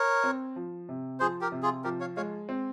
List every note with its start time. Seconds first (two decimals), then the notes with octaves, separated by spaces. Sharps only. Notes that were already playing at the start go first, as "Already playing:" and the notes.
Already playing: A#4 C#5
0.24 C4
0.56 F3
0.89 C3
1.20 F3 G#4 C5
1.41 G4 A#4
1.52 C3
1.63 F4 G#4
1.84 F3 G4 A#4
2.00 C#5 F5
2.16 G#3 C#5 F5
2.49 C4